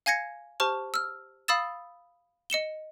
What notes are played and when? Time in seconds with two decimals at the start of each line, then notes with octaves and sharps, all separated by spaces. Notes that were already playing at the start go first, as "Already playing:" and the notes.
0.06 F5 G#5 G#6 A#6 C#7
0.60 G4 C5 A5 C#6 F6
0.94 E6 F6
1.48 F5 B5 D#6 E6 A6 E7
2.50 D#5 C#7 E7 G7